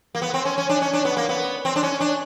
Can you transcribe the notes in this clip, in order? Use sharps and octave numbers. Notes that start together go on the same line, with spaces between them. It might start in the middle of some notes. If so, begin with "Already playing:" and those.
A#3
B3
C4
C#4
C#4
D4
C#4
D4
B3
A#3
B3
C4
D4
C#4
D4